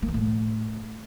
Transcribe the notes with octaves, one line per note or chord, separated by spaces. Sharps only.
A#3
E3
A2